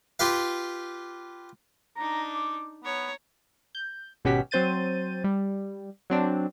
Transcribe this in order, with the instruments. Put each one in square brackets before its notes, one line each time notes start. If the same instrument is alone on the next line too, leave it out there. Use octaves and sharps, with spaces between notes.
[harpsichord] F4 G4 B4 F5
[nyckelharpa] D4 D#4 [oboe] A#5
[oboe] D6
[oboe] B3 [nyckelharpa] C#5 A#5
[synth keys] G6
G#1 B2 C#4 F#4 G4 B6
F#3 C4 C5 G6 A6 D#7
G3
F#3 C4 D4